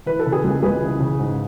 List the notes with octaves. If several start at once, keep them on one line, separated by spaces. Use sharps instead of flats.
E3 B4
A4
C#3
G#4 B4
C#2
C#2 G#4 B4
E3
C#3
G#2